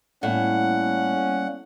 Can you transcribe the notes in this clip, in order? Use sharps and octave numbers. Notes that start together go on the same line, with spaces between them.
A2 G3 A#3 B3 C#4 F#5